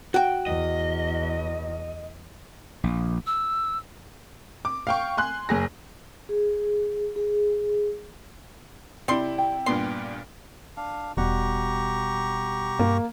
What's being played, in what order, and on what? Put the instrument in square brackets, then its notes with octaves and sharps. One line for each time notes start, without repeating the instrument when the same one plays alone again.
[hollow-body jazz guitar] F#4 G5
[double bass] E2 [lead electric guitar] D#5
[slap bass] A#1
[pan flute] E6
[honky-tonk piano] D6
F5 G5 C#6
G#5 C6 F#6
F#1 G#4 A#6
[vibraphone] G#4
G#4
[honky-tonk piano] C3 E4 [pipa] G3 C6
[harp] G5
[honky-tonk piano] G2 A#2 B3 [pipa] C6
[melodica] D4 F5
[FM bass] E1 [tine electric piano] B2 G3 F#5 [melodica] G4 A#5 C#6
[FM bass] G2 [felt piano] A#3